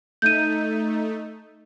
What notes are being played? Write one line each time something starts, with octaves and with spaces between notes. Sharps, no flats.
A3 D#4 G6 D#7